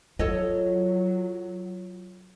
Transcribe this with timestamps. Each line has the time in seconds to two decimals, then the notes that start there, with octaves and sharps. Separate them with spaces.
0.19 F#3 F4 A4 C#5 D#5